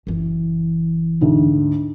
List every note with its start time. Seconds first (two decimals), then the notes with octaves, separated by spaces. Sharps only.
0.07 F#1 E3
1.21 D2 G#2